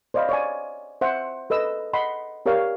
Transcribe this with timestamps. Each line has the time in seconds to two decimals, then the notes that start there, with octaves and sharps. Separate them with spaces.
0.14 C5 D5 D#5 F5 B5
0.29 C#5 D5 G#5
1.01 C5 E5 F#5
1.50 A4 B4 D#5 E6
1.93 D#5 F#5 B5 C6
2.46 G4 A#4 C#5 D5 F5